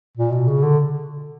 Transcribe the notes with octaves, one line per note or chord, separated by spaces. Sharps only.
A#2
B2
C#3
D3